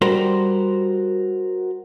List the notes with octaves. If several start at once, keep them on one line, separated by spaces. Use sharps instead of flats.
G3 F#4 A#4 C5